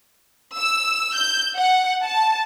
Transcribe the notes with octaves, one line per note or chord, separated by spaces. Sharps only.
E6
G6
F#5
A5